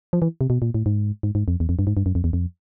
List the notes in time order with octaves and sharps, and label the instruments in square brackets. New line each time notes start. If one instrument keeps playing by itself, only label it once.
[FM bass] F3
E3
C3
B2
A#2
A2
G#2
G#2
G#2
F2
E2
F2
G2
G#2
G2
F#2
F2
E2
F2